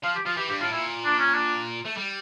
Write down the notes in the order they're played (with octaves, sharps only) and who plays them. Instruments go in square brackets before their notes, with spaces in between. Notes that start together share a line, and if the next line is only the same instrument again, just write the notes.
[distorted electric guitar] F3 [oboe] F5
[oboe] G4
[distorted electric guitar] F3 [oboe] F4
[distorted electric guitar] E3 [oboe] G4
[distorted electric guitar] G2 [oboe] G4
[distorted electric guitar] A2 [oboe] F4
[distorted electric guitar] A#2 [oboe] E4
[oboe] D4
C#4
D4
[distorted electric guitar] A3
G3